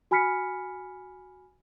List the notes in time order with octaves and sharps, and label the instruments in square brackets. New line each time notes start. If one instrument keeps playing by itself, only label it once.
[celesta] F#4 G#5 B5 F6 B6 C#7